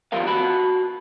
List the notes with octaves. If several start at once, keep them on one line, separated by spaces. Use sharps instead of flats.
D#2 F3 G3 A#4 F5
F#4 A5 B5